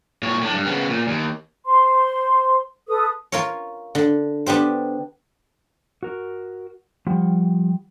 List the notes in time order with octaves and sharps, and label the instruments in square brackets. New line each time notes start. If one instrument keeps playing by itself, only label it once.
[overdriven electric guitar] A#2 C#5
A2 D4
G2
C#3 B3
A#2
D#2
[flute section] C5 C6
A4 B4 D#6
[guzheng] F4 A#4 C#5
D3
B3 D4 G4 C5
[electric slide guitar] F#4 A#4
F3 G3 F#5 G5